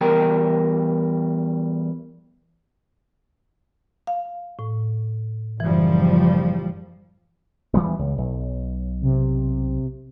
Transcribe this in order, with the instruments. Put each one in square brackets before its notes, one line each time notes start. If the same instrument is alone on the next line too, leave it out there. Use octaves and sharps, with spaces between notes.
[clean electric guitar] E2 G3 A#4 G5
[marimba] F5
A2
[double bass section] F#1 F3 G3 [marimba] E3
[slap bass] E3 G3 B3
C#2
B1
[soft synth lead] C3